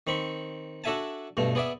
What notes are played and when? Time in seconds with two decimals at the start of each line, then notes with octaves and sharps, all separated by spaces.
0.07 D#3 C4 B5 C#6
0.84 D4 F#4 A4 E5 G#5 A5
1.37 G2 B2 A3
1.55 B3 G#4 D5 E5